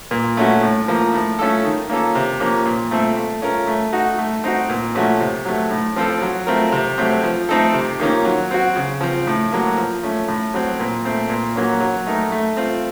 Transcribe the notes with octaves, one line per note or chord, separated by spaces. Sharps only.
A#2
A3 C#4 F#4
A2
F3 A#3
A2
A3 C#4 F4 A4
D#3
A#3 C#4 F4 A4
C3
F3 A#3 C#4
A#2
A3 C4 F4 A4
A3
C#4 F4 A#4
A3
D#4 F#4
A3
C4 D#4 F#4
A#2
F3 A3 C#4 F#4
C3
F#3 A3
A2
F3 C4 F4 A4
F#3
A3 C4 F4 A#4
C3
F#3 A3 C4
F3
A3 C4 D#4 A4
C3
D#3 A#3 C#4 F4
F#3
C4 F#4
C#3
F3 C4
A2
F#3 A#3
F3
A3 C#4
A2
F#3 C4
A#2
A3 C4
A#2
F#3 A#3 C#4
F#3
A3 D#4 A#4
A3
C4 F4